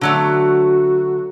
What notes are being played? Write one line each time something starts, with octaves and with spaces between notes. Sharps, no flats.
D3 F#3 A3 F#4